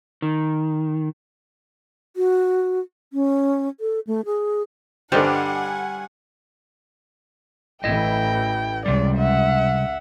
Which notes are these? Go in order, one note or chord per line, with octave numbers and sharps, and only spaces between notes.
D#3
F#4
C#4
A4
A3
G#4
G2 D3 G3 C5 D5 D#5 F#5 G#5
A1 E3 E4 D#5 G5
C#2 C3 G3 D5
E5 F#5